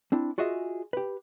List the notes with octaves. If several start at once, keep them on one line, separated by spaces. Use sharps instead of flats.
C4 D4 E4
F4 F#4 G#4 D#5 E5
G4 B4